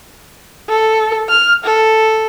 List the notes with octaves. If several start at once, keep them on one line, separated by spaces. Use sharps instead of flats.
A4
F6
A4